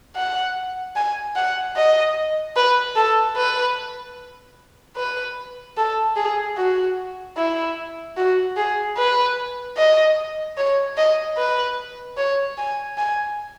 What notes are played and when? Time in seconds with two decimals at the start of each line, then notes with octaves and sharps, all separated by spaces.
0.16 F#5
0.96 G#5
1.36 F#5
1.76 D#5
2.56 B4
2.96 A4
3.37 B4
4.97 B4
5.77 A4
6.16 G#4
6.57 F#4
7.37 E4
8.17 F#4
8.57 G#4
8.97 B4
9.77 D#5
10.58 C#5
10.97 D#5
11.38 B4
12.18 C#5
12.58 G#5
12.98 G#5